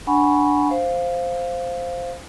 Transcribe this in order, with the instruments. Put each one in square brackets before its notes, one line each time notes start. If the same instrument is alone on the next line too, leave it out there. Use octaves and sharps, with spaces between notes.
[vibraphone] D4 F#5 G#5 B5 C#6
C5 F5